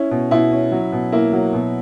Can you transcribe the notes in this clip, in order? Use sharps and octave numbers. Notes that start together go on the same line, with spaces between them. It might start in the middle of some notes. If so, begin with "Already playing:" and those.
Already playing: C#4 E4
B2
B2 E4
C#4
F#3
B2
A#3 E4
F#3
B2